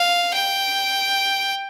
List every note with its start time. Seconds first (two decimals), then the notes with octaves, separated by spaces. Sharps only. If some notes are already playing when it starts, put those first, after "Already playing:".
Already playing: F5
0.34 G5